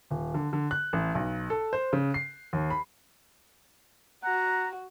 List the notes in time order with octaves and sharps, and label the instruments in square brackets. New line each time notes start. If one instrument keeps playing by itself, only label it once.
[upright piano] D#1
D3
D3
F#6
A1
B1
A4
C5
C#3
C7
D#2
B5
[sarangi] F#4 [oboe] F#5 [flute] A#5